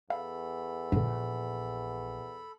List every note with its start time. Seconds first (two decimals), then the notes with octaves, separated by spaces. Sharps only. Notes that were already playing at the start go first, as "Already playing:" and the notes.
0.10 E2 A4 F5 B5
0.92 A#1 G2 D3